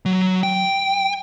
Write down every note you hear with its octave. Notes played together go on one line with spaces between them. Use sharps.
F#3
G5